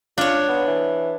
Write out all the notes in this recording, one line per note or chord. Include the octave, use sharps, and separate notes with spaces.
D4 F4 C#5
B3
E3